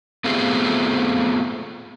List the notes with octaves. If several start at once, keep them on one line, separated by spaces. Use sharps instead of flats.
A3 B3 C4 F4 G4 G#4